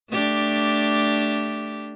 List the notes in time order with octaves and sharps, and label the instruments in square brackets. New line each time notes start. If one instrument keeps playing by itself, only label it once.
[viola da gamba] A3 D4 G4